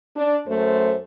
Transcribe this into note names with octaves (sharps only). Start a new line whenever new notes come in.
D4
F#2 A3 C5